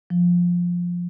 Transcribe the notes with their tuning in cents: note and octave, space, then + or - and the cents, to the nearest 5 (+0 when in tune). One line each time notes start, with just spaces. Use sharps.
F3 +10